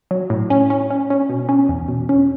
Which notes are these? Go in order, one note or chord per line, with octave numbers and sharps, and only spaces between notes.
F#3
A2
C#4
C#4
C#4
C#4
B2
C#4
E2
B2
C#4